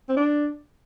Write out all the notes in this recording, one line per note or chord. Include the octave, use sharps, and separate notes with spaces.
C4
D4